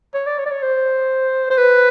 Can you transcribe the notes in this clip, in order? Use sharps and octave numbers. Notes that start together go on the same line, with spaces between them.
C#5
D5
C#5
D5
C#5
C5
C5
B4